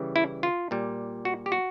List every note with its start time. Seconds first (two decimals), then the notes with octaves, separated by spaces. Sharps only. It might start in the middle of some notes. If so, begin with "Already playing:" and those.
Already playing: C#3 E3 G3
0.16 E4
0.43 F4
0.71 A#2 G3
1.25 F#4
1.46 G4
1.52 F#4